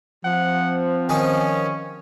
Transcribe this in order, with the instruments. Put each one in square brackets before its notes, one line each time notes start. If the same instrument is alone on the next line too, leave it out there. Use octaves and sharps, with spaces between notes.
[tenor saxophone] F3 [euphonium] C4 [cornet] F#5
[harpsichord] D#3 G#4 [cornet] C#4